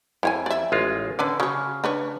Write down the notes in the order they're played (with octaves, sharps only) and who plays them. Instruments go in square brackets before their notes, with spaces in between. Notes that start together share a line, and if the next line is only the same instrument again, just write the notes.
[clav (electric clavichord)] F2 [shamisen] E4 C#5 G#5
[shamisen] D5 E5
[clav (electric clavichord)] A1 G#3 F4
[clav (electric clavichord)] D3 [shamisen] C#4 B4 D5
[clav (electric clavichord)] C#3 [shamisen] F#3 C#5
[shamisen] D4 B4 C#5